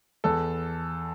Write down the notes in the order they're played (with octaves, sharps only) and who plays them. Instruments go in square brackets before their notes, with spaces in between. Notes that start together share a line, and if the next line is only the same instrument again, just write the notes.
[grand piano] E2 A4